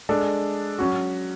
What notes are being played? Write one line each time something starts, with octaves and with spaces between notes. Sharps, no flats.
G#3 D4 A4
F#3 C#4 F#4